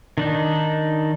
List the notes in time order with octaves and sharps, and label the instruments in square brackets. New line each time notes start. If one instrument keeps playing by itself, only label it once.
[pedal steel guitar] D#3 D4 D#4